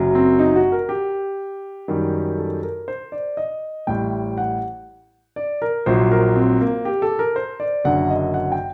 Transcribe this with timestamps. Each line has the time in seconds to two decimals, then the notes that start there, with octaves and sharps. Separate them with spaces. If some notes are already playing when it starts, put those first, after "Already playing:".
Already playing: F#1 F#2 F#3
0.15 C4
0.39 D#4
0.56 F#4
0.72 A#4
0.89 G4
1.88 F#2 D#3 G3
2.38 A4
2.63 A#4
2.88 C5
3.12 D5
3.37 D#5
3.87 A1 A2 G3 G5
4.38 F#5
5.36 D5
5.62 A#4
5.86 A#1 A#2 F#3 C5
6.11 A#4
6.36 C4
6.61 A#3
6.85 G4
7.02 A4
7.19 A#4
7.36 C5
7.60 D5
7.84 F#1 F#2 D3 F#5
8.10 D#5
8.34 F#5
8.52 G5